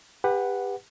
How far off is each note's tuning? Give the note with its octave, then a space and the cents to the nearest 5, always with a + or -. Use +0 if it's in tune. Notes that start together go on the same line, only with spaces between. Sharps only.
G4 +30 B4 +0 F#5 +0